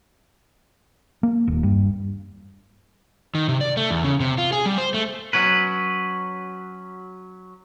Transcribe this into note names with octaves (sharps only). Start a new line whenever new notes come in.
A#3
D#1
G2
D#3
C3
D5
A3
E2
C#3
C3
F4
G#4
G3
C5
A3
F#3 C#4 B4